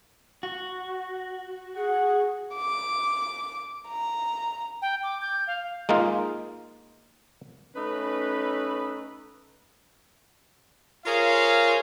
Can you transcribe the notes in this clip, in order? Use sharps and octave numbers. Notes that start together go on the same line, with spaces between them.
F#4
G#4 F#5
D6
A#5
G5
D6
G6
F5
G#3 A#3 D#4 F4
A3 C#4 D#4 B4
F4 G#4 A#4 C5 C#5 F5